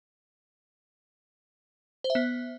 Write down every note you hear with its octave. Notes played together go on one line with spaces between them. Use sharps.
C5
E5
B3